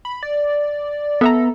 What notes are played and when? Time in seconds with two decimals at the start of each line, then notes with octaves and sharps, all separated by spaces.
0.05 B5
0.23 D5
1.21 B3 A4 E5 A#5